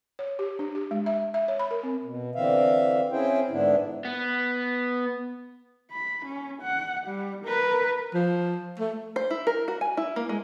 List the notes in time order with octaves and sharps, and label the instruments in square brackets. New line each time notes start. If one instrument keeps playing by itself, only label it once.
[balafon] C#5
G4
D4
G4
G#3
E5
E5
C#5
B5
A#4
C4
[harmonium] B2
D3 E3 C4 E5 F5
C4 C#4 E4 G#4 C5 G5
G#2 D3 B3 D4 E4
[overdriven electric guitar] B3
[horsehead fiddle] B5
C#4
F#5
G3
A#4 B4
[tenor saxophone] F3
A3
[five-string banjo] C5
E4
A#4
F#4
G#5
E4
A#3
G#3